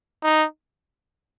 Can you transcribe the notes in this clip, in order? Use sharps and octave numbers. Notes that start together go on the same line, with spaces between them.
D#4